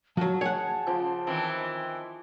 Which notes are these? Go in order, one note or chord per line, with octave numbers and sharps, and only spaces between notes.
F3 F#3 F#4 A5
G#4 C#5 F#5
C#3 F3 C6 D6
D#3 E3 C4